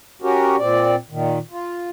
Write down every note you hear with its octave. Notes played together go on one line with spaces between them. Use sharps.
C#4 F#4 G4 A#4
A#2 C4 D5
A#2 D#3
F4